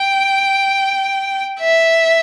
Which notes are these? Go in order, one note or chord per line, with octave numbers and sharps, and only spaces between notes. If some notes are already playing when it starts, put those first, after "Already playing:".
Already playing: G5
E5